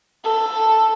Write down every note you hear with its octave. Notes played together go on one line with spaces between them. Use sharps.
A4